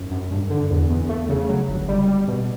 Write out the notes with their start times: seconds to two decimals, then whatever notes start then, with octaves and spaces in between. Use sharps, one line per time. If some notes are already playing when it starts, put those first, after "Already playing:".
Already playing: F#2
0.11 F#2
0.31 G2
0.50 D3
0.70 E2
0.89 E2
1.09 A3
1.29 C#3
1.49 F#3
1.68 G1
1.88 G3
2.07 G3
2.28 B2